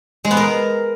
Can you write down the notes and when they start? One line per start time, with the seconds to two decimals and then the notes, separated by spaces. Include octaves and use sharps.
0.25 G#3
0.31 B3
0.37 A#4